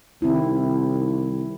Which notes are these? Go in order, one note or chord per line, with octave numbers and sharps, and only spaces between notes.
C2 D#3 C4 E4